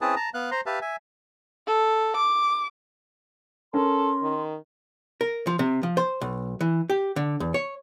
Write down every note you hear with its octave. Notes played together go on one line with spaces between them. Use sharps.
C4 C#4 E4 G#4 B4 A5
A5 A#5
B3 F5 F#6
C5 A#5 C6
G4 B4 E5 F5 A5
E5 G#5
A4
D6
C#4 A4 A#4 C6
D#3
A#4
F3
C3
F3
C5
B1
E3
G4
D3
E2
C#5